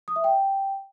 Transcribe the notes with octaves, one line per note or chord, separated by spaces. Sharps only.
D#6
E5
G5